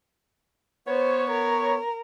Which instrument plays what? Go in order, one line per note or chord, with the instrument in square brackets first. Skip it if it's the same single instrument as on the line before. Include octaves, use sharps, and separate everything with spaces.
[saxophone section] B3 C#5 [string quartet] C5
[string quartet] A#4